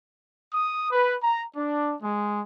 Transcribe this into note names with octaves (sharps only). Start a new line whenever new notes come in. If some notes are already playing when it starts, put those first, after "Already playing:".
D#6
B4
A#5
D4
G#3